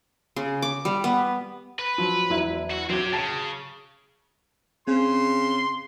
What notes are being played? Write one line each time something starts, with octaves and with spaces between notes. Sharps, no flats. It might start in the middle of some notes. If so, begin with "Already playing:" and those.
C#3
D6
G3
B3
B4
F3 F#3
E1 F#3 E4
F#4
F#3 C4 G4 G#6
C#3 A5 A6
C#3 C4 C6